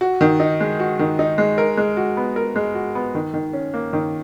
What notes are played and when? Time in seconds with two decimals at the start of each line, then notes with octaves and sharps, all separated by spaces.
0.01 F#4
0.21 D#3
0.40 D#4
0.60 G#3
0.80 F#4
0.99 D#3
1.19 D#4
1.38 G#3
1.58 A#4
1.77 G#3
1.97 F#4
2.17 B3
2.36 A#4
2.56 G#3
2.75 F#4
2.95 B3
3.15 D#3
3.34 D#3
3.53 C#4
3.74 A#3
3.93 D#3